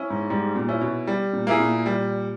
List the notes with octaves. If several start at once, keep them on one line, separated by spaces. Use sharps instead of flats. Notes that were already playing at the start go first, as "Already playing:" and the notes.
Already playing: C#4 E4
G#2
G#2 G3
A#2
C#4 E4
B2
G3
A#2
A#3 E4 G#4
A#2
G3